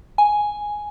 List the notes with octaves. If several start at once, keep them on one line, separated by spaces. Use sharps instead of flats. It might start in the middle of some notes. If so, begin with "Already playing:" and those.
G#5